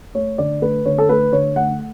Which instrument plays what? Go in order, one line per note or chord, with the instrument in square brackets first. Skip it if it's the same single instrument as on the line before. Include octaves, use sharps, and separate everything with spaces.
[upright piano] A3 C#5
D3 D5
A3 B4
D3 C#5
A4
A3 B4
D3 C#5
A3 F#5